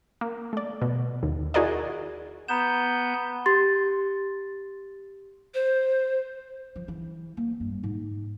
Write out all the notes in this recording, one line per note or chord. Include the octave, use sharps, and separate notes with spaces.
A#3
A3 D5
B2
D#2
E4 F#4 G#4 A#4 D5 D#5
B3 A#5 G6 E7
G4 C6 A6
C5
F3
E3
A#3
G2
G#2